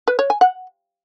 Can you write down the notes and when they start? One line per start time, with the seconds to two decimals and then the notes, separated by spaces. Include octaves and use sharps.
0.08 B4
0.19 C#5
0.30 G#5
0.41 F#5